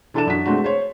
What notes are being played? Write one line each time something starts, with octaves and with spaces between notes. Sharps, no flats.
E3 D4 A4 D5 A5 E7
F#2 D4 F#4 B6
G#3 A3 C4 D4 F#4
C5 C#5